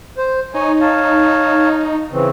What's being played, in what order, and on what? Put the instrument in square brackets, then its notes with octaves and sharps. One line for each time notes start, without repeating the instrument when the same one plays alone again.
[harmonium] C5
[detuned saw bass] D#4 [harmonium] C#5 G#5
[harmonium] C#5 F5 A5
C#3 E3 C4